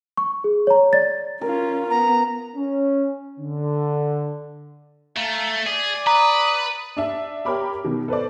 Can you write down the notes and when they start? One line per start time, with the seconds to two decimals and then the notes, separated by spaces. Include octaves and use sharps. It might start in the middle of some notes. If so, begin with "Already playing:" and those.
0.17 C#6
0.44 G#4
0.67 C#5 A#5
0.93 D5 A6
1.41 C#4 F4 A#4
1.90 B3 A#5
2.55 C#4
3.40 D3
5.16 A3 F5 A5 A#5
5.67 G#4 D5
6.07 B4 A#5 D#6
6.97 D4 E5
7.45 G4 A#4 C#5 B5 D6
7.84 B2 D#3
8.08 A4 B4 C5 D5